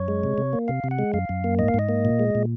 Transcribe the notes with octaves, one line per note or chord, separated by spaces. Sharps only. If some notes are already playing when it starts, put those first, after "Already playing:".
Already playing: F#2 C#5
G#3
C3
C3
A#3
C3 F5
C3
F#5
G#3
F#2 F5
F#2
A#3
G#2 D#5
F5
G#2 D#5
A#3
A#2
G#3
A#2